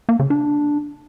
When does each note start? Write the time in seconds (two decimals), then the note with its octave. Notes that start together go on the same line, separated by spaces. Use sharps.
0.09 A#3
0.19 C#3
0.30 D4